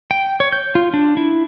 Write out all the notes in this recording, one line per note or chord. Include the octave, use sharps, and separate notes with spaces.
G5
C#5
G6
F4
D4
E4